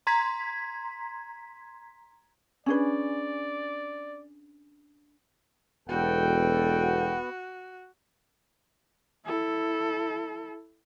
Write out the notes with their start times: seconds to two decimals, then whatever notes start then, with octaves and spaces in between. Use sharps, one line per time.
0.07 A#5 C6 G#6 B6
2.66 C#4 D4 G#4 B4 D5
5.89 E1 B3 F#4 A4 G5
9.26 E4 A4